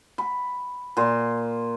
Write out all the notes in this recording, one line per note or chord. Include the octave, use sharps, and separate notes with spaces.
B5
A#2 C6